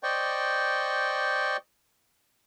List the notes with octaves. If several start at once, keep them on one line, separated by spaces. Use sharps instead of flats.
C5 D5 D#5 G5 C#6